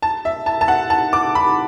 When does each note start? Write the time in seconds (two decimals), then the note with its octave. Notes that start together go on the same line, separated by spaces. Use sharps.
0.02 A5
0.25 E5
0.46 A5
0.61 A5
0.68 F#5
0.90 A5
1.13 D6
1.35 B5